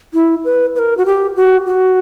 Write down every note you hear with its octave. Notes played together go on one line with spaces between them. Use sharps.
E4
B4
B4
A#4
F#4
G4
F#4
F#4